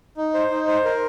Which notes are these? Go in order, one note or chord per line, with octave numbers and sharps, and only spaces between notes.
D#4
C5
D#4
C5
A#4